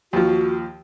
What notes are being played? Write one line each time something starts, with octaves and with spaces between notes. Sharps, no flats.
D#2 F3 F#4